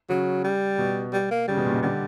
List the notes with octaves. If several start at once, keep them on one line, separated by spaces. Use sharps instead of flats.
C#3 F#3
G3
B2
G3
A#3
C#3 G3
B2
A#2
B2
D3 G3